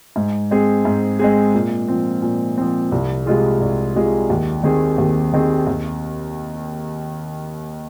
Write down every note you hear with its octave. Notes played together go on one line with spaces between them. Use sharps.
G#2
G#3 C4 G#4
G#2
G#3 C4 G#4
A#2
F3 C4
A#2
F3 C4
C2
C3 G#3 F4 G#4
C2
C3 G#3 F4 G#4
D#2
D#3 C4 G#4
D#2
D#3 C4 G#4
D#2